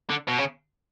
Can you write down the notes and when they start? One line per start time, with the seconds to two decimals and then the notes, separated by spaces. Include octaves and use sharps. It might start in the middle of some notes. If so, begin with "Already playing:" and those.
0.10 D3
0.28 B2
0.39 C#3